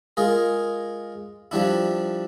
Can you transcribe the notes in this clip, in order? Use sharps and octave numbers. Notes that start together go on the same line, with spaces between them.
G#3 F4 G#4 A#4
F3 G3 D4 E4